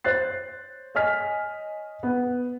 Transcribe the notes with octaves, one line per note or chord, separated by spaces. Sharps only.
C5 C#5 F#6 A6 C7
C#5 D#5 G#5 F6 B6
B3